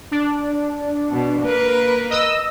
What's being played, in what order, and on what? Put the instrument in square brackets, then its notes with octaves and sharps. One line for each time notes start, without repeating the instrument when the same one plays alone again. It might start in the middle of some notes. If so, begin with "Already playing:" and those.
[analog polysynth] D4
[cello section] B2
A#3 A#4 B4
[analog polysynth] D#5 E6